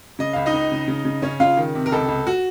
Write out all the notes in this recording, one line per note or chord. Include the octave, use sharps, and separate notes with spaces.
C#3 D#5
C#2 F5
D#4 D#5
C#2
C#3
C#3
C#3
C#3 C#4 C#5
C#3 F4 F5
D#3
C3
A#4
C#2 A4
C#2
F#4